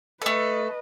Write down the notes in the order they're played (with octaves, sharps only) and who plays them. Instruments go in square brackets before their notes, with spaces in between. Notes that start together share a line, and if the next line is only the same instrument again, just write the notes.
[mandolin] A3 A4 [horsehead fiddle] B4 D#5